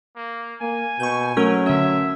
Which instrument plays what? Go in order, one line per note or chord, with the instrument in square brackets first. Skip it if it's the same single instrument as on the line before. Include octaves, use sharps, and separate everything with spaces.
[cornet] A#3
[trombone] A#3 [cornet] G#5
[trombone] B2 [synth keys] C#6 G6
[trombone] F#3 [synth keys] A3 C#4 A#4
[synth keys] D3 C#4 [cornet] E5